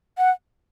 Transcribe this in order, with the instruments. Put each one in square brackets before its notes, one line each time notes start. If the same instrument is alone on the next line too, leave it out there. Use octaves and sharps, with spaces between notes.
[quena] F#5